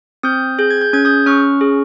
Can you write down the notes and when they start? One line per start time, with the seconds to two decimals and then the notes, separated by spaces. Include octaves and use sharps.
0.23 C4 D#6 G6
0.59 G#4 G6
0.71 G#6
0.81 G6
0.93 C#4 G#6
1.05 D#6 G6
1.26 C#4 C#6 F6
1.61 G#4